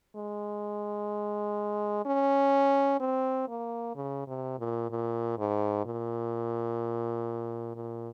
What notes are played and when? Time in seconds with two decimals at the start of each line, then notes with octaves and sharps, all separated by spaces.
0.16 G#3
2.06 C#4
3.00 C4
3.48 A#3
3.95 C#3
4.27 C3
4.59 A#2
4.90 A#2
5.38 G#2
5.85 A#2
7.76 A#2